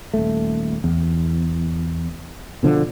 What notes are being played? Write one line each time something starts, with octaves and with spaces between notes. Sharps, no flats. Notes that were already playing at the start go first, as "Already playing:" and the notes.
D#1 A3
E2
B2 D3 F3